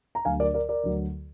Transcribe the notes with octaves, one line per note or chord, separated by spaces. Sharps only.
A#5
D2 D3 F#3 F5 G#5
A#4 D5
A#4 D5
A#4 D5
D2 D3 F#3